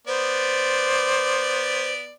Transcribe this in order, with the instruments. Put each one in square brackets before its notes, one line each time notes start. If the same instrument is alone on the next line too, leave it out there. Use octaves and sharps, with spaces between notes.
[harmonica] B3 D5 [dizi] C5